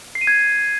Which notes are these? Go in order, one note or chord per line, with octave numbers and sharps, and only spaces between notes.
C7
D#7
G#6